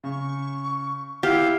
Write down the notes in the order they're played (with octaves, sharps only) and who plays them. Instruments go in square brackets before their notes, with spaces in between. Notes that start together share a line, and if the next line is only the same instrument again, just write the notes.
[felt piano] C#3 [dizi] C#6
[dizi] E4 [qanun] G4 [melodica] F5 [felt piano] F#5